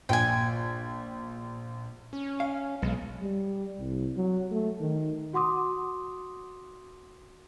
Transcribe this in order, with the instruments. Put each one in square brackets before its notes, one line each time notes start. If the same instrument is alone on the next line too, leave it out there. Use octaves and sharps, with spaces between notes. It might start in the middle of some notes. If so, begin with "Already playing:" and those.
[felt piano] A#1 [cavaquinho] G5 G#5
[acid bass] C#4
[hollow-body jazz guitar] F5
[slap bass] B1 [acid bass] G#3
[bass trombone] G3
C2
F#3
A3
D#3
[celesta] F#4 F#5 C6 D6 D#6